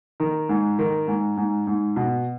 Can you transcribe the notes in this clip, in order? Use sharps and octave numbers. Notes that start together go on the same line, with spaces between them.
D#3
G#2
D#3
G#2
G#2
G#2
B2